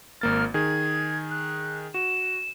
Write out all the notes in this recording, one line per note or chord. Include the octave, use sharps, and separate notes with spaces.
G#1 A#3 F6 A6
D#3 G#4 G#6
F#6
F#4 E7